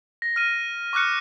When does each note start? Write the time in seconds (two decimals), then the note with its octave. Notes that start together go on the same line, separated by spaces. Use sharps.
0.22 A#6
0.36 F6 D#7
0.93 C#6 D6 F6 F#6 C#7